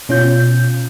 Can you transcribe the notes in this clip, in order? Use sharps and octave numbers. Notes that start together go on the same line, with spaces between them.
B2 C#4 F4 G6